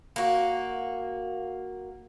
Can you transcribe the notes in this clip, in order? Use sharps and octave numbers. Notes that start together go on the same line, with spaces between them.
A#3 F#4